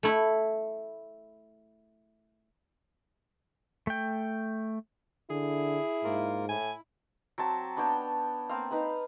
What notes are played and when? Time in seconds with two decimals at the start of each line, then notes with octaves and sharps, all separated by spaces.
0.03 A3 E4
3.87 A3 G5
5.30 D3 E4 G#4
6.04 G#2 A#3 F4 A#4
6.49 A2 E4 G#5
7.38 F#3 C4 A5
7.77 B3 D4 C#5 G5
8.49 A#3 C4 F5
8.71 D#4 B4 B5